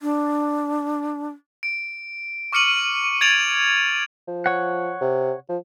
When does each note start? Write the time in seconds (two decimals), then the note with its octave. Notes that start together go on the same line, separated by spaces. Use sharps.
0.02 D4
1.63 D7
2.52 C#6 D6 F6 C#7 D#7 F#7
3.21 G#6 A6 D7 F7 F#7
4.28 F3
4.46 C#5 F#5
5.01 C3
5.49 F3